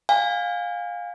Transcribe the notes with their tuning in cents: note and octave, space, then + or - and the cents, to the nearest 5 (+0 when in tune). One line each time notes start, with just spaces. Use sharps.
F5 +20 G#5 -35